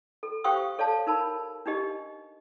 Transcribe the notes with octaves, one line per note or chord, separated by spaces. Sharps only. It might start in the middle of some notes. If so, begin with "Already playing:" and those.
A4
G4 C5 F5 G5 C#6 D#6
A4 C#5 D5 F5 A5
D#4 A#4 A5 B5
D4 D#4 G4 D#5